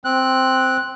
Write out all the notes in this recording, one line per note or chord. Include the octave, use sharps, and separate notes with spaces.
C4 F#6